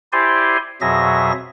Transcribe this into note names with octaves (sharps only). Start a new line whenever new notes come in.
E4 G4 C5 D5 G#5 C6
F2 B2 F#3 G#4 E5 A#6